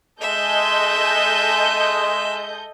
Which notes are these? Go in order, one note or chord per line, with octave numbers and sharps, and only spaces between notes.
G#3 A4 D#5 E5 G6